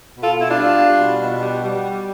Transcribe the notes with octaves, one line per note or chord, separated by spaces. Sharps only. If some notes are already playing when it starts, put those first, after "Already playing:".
B2
F4 A4
B2 E4
D4 F4
G3
G3
B2
B2
G3
G3